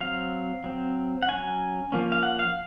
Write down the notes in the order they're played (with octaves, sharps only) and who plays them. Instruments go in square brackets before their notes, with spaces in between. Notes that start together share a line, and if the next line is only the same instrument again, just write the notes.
[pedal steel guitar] F#3 C4 F5
F#3 C4
F#5
F#3 C#4 G#5
F3 A#3 C#4
F5
F#5
F5